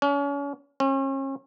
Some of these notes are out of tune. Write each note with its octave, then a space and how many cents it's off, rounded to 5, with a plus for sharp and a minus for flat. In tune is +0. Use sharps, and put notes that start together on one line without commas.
C#4 +35
C#4 -40